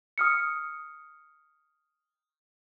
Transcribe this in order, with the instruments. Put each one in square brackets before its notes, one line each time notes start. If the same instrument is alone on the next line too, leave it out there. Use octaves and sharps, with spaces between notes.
[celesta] D#6 F6 C#7